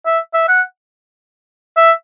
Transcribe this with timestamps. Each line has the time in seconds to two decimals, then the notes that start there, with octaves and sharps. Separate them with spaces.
0.06 E5
0.34 E5
0.48 F#5
1.77 E5